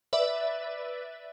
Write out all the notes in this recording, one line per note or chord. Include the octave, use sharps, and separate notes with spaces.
B4 D5 E5